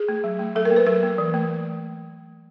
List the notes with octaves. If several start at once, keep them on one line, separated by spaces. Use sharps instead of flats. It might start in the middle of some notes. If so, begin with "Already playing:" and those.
Already playing: G#4
A3
F#3
A3
F#3 A4
A#4
A#3
B4
F#3 A#4
A#3
E3
A3